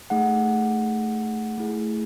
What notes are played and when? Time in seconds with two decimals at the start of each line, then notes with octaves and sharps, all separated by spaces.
0.10 A3 D#4 G#4 F#5
1.58 A3 E4 G#4